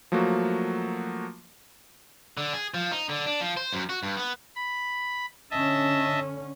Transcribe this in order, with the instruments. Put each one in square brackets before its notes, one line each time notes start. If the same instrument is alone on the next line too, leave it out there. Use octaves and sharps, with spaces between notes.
[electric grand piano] F3 F#3 A3 A#3 F#4
[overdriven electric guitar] D3
G#4
F3
D#4
D3
D4
F3
C5
F#2
F#4
G2
B3
[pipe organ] B5
[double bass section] D3 C#4 [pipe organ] D#5 E5 A5